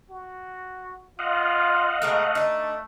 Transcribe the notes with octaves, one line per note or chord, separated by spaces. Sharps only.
F#4
F4 D#5 F5 F#5
B2 G#3 A3 A#4
D4 D#4